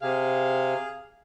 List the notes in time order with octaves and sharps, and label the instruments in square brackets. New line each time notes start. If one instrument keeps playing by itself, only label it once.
[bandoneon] C3 [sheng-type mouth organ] G#4 [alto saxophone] F5